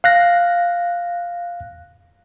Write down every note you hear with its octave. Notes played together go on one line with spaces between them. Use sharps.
F5 F#6 A#6